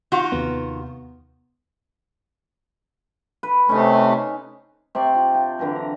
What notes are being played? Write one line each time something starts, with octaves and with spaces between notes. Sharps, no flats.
D#3 F4 F#4
D#2 C3 B3
B4
C3 A3 C#4 D#4
C3 C5 D5 C#6
F4
G5 A5
D3 E3 F#3 A#4
A#5